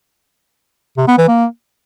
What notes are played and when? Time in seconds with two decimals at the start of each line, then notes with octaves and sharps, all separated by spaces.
0.98 C3
1.08 B3
1.18 E3
1.28 A#3